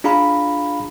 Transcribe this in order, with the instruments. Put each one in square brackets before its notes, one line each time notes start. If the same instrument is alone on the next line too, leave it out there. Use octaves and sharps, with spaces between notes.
[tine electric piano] D4 F4 G#4 F5 A#5 B5